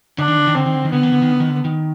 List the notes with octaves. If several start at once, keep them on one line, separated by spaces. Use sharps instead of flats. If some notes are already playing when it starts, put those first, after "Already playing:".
D3 D4
D#3
D3
D#3
D3 C4
D#3
D3
D#3
D3 B3
D#3
D3
D#3
D3
D#3
D3
D#3